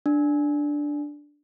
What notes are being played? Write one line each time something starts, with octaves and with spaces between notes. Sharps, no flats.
D4